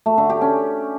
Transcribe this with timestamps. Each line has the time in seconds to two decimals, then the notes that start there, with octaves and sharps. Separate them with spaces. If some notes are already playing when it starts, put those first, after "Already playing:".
0.06 A3
0.18 D3
0.30 G4
0.41 C#4